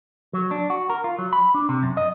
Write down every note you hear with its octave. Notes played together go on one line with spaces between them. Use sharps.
F#3
D4
F#4
A#4
F4
F#3
B5
D4
C3
F#2
D#5